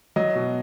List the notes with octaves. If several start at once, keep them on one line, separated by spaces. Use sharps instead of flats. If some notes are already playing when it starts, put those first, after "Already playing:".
F#3 D#5
B2